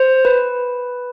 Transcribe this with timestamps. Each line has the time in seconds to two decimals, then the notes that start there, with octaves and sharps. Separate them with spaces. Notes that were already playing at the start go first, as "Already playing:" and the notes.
Already playing: C5
0.25 B4